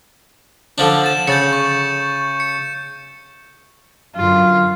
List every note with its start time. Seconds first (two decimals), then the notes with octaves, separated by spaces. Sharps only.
0.78 D3 F3 D4
1.04 A6 E7
1.28 C#3 G6 A6 C#7
1.53 C#6
2.40 C#7
4.16 F#2 D3 F4